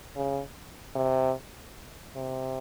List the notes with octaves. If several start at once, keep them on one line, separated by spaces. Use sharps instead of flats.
C#3
C3
C3